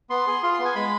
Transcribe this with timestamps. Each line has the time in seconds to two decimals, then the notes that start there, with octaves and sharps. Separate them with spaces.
0.10 B3 C6
0.27 G#4
0.43 F4 C6
0.54 B3 C6
0.65 G#5
0.75 G#3 B5